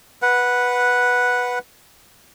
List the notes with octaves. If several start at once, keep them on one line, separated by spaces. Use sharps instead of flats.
B4 F#5